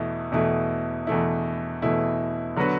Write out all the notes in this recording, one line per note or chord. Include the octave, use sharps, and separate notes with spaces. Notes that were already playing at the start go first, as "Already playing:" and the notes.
Already playing: E2 B2 A3 E4
E2 B2 A3 E4
E2 B2 A3 E4
E2 B2 A3 E4
D3 F#3 B3 F#4 B4